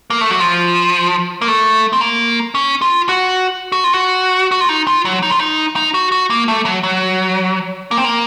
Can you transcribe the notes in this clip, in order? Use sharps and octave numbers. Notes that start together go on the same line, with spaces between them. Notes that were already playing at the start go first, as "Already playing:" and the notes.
A#3
A3
F#3
F3
A#3
A3
C4
A#3
C#4
F4
F#4
F#4
F4
F#4
F#4
F4
D#4
F4
F#3
D#4
F4
D#4
D#4
F#4
F#4
A#3
A3
F#3
F#3
A#3
C4
A#3